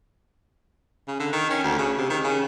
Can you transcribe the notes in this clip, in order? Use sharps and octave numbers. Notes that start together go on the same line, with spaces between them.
C#3
D3
D#3
C#4
D2
C#3
C3
D#3
C#3